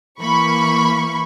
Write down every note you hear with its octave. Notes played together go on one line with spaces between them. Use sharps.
E3 A#3 B5 C#6